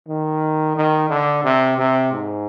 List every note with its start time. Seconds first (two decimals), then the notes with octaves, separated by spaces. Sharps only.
0.08 D#3
0.76 D#3
1.09 D3
1.44 C3
1.78 C3
2.12 G#2